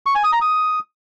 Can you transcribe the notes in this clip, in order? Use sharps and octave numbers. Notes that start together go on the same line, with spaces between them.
C#6
G#5
D#6
A#5
D#6